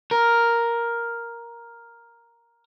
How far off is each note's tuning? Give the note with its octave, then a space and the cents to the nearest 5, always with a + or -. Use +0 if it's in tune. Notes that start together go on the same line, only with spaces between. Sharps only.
A#4 +5